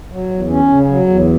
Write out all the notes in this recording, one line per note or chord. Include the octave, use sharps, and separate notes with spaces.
F#3
E2
C#4
C#3
F#3
E2